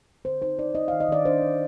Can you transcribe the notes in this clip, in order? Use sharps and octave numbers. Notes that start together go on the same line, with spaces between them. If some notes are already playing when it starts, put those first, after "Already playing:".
D3 C5
D#4 C5
D#4 D5
D#4 D#5
F5
D#3
D#5
D#3 D5
D4 C5
D4